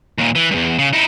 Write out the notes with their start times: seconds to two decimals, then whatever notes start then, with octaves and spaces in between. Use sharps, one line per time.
0.18 D#2 A#2
0.35 E3
0.51 E2 G2
0.79 C#3
0.93 D#4 E4